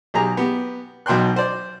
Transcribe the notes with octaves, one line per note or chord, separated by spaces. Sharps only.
B1 G4 G#4 A#5
B3 G4
B1 B2 G5 C6 F#6
C5 D5